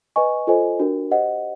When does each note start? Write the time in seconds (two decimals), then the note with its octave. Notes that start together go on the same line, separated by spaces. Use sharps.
0.16 B4 D#5 G#5 C#6
0.47 F4 A4 C5 D#5 G#5
0.80 D4 F#4 A#4
1.11 G4 C5 D#5 F#5